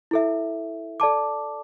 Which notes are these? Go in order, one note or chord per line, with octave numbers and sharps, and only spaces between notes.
E4 A4 E5
A4 D5 A5 D6